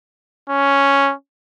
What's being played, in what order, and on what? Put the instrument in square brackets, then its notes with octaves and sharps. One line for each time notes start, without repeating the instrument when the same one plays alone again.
[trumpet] C#4